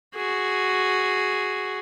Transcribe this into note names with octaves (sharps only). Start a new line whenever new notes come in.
F#4 G#4